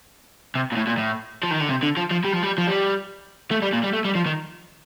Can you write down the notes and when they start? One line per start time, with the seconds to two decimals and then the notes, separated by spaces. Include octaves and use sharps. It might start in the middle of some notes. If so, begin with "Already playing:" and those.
0.55 C3
0.72 A#2
0.76 A2
0.87 A#2
0.98 A2
1.43 F3
1.51 D#3
1.60 D3
1.69 C3
1.83 D3
1.97 F3
2.11 F3
2.25 G3
2.33 F3
2.43 G3
2.58 F3
2.67 G3
3.51 A3
3.62 G3
3.73 A#2
3.84 G3
3.93 A3
4.05 G3
4.15 F3
4.26 D#3